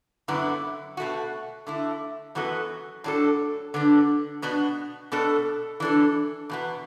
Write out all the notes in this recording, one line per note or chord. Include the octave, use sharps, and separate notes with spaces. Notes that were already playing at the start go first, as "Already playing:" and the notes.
F#2 D3 B3 E4
B2 A3 F#4
D3 A3 E4
F#2 E3 B3 F#4 A4
A2 F#3 D4 A4
D3 B3 D4
B2 B3 D4 F#4
B2 B3 D4 A4
E3 D4 A4
E2 B2 B3